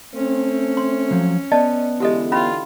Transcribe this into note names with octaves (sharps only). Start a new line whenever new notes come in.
A3 C4 C#4
C6
F3 F#3
B3 D5 D#5 A5
D3 E3 G#3 E4 G4 A4 D#5
C#4 F4 B5